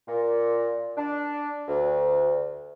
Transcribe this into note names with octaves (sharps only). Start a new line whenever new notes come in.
A#2
D4
D2